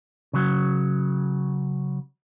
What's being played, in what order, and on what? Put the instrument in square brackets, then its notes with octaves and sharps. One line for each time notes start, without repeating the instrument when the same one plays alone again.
[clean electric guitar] C#3 F#3